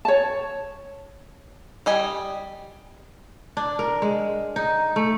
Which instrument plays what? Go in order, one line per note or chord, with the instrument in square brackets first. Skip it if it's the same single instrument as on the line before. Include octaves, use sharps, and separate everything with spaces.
[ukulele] C#5 A5
[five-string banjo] G3 D#5 G#5
[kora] D4
A#4
G#3
D#4
A3